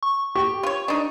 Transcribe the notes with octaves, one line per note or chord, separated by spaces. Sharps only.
C#6
G4 C#6
F4 C#5
D4 D#4